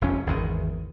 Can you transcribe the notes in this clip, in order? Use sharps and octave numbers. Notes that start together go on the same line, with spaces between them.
F1 F2 C#4
G#1 E2 D#3